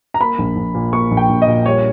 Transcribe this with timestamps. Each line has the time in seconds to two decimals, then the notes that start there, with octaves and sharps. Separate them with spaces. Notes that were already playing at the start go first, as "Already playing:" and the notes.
0.14 A#5
0.20 A#3 B5
0.38 A#1
0.56 A#1
0.75 A#2
0.93 A#3 C#6
1.11 A#1
1.17 G5
1.29 A#1
1.42 D#5
1.47 A#2
1.66 G3 C#5